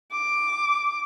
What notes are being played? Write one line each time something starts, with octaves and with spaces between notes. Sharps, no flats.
D6